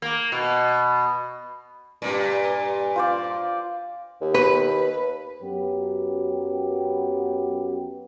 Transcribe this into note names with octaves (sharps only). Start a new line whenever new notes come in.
A#3
B2
G2 A#2
F4 C5 D5
D#2
B4
F#2 F#3 B3 G4